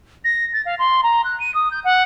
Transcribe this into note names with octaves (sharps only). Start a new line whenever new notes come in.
A#6
A6
F5
C6
A#5
F#6
D#7
D#6
G6
F#5